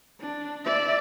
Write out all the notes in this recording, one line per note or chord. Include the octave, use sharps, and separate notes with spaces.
D4
D5 E5